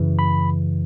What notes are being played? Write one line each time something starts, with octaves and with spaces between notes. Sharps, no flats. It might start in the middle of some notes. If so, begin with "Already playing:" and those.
Already playing: F#2 C#3 E3
B5